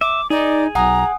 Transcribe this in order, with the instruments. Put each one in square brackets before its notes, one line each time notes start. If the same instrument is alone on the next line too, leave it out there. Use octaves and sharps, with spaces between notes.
[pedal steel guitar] E5 [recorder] D6
[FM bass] D#4 [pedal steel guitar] G#4 [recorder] D5
[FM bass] B1 [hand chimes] F#5 G#5 D#6 [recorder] A#5